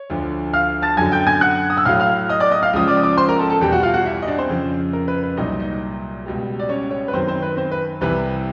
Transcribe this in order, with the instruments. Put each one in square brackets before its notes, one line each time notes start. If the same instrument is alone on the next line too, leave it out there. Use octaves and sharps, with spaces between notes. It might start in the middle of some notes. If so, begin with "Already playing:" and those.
Already playing: [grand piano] C#5
D2 D3 F3
F5 F6
A5 A6
F#2 D3 F#3 G#5 G#6
G5 G6
G#5 G#6
F#5 F#6
D#6
E6
A2 F#3 F5 F6
F5 F6
D#5 D#6
D5 D6
D#5 D#6
F5 F6
C#2 C#3 F3 D#6
D5 D6
D#6
D5 D6
C5 C6
A#4 A#5
A4 A5
A4 A5
E2 B2 G3 G4 G5
F#4 F#5
F4 F5
F#4 F#5
E4 E5
D#5
D4 D5
C4 C5
F2 C#3 F3
A#4
B4
B4
C2 A#2 F#3 D#4 D#5
D#4 D#5
C#2 B2 G3
D5
C#4 C#5
C#4 C#5
B4
F#2 D#3 F#3 C4 C5
C4 C5
B4
C4 C5
B4
C2 C3 E3 G3 B4